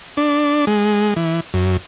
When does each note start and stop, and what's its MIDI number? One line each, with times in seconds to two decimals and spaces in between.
0.17 0.65 62
0.67 1.14 56
1.16 1.40 52
1.54 1.77 42